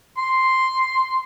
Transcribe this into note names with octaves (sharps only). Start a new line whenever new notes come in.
C6